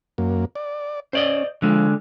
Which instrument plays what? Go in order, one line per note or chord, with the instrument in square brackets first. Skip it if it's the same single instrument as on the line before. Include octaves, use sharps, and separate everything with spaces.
[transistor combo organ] F#2 A#3
D5
[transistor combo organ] C#4 [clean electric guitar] C5 D5 D#5
[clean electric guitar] D3 G#3 [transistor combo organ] F3